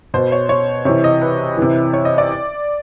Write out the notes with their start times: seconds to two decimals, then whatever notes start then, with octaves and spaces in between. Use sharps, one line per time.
0.14 B2 C5
0.32 C#5
0.49 C#5
0.85 C3 E3 C#5
1.04 D#5
1.22 B4
1.57 C3 E3
1.93 C#5
2.05 D#5
2.18 D5